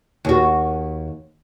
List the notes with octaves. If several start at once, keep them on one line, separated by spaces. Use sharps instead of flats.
D#2 F#4